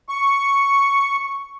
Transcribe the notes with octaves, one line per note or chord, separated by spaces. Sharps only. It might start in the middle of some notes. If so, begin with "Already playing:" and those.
C#6